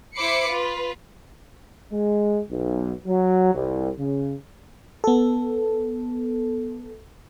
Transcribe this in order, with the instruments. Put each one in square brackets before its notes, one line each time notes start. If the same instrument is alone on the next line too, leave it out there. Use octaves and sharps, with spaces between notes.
[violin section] E4 C5 B5 D6 C7 C#7
F4 B4
[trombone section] G#3
B1
F#3
C2
C#3
[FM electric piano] B3 A4